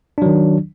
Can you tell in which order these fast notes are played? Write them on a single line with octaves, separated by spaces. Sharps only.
D4 F#3 D#3